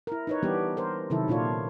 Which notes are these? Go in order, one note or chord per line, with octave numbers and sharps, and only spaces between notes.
E4 A#4
D#4 B4 C#5
E3 G3 B3 D4 G4
A#4 C5
C3 D#3 F#3 E4 A4
A#2 D4 F4 C#5